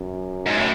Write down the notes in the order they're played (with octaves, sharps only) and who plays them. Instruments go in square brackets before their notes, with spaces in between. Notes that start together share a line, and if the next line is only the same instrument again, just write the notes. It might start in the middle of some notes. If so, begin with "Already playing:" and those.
Already playing: [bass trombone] F#2
[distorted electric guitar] G#2
A2